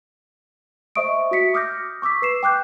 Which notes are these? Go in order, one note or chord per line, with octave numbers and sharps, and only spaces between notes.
C5 D#5 E5 C#6 D#6 D7
F#4 E5 B6 C#7
D6 D#6 F6 G6 A#6
C#6 D6 E6 B6
B4 C7 E7
G5 D6 F#6 G6